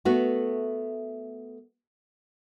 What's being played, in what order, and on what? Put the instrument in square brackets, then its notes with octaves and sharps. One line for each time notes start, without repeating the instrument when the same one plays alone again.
[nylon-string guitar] A3 B3 F#4